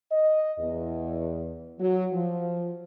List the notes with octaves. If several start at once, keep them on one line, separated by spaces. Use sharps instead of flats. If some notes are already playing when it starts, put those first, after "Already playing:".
D#5
E2
F#3
F3